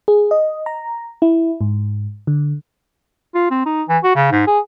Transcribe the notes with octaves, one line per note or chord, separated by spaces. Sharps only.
G#4
D#5
A#5
E4
G#2
D3
F4
C4
D#4
E3
F#4
C#3
G#2
G#4